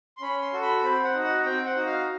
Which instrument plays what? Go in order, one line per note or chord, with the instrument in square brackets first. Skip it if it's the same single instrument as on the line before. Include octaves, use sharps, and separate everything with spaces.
[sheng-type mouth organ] C6
C#4 B5
C6
F#4 A4
B5
C4 B5
F#5
D#4
F#4
F#5
C4 G5
F#5
D#4 F#4
F5